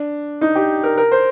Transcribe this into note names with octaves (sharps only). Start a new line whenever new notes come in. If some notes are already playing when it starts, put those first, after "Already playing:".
Already playing: D4
D#4
G4
A#4
A#4
C5